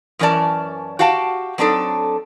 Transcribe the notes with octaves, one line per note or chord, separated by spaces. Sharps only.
F#2 E3 C#4 A#4 D5 A5
F#4 G4 F5 G5 A5
F#3 C4 D4 D#4 A4